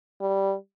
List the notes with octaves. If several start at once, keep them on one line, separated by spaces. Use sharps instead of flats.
G3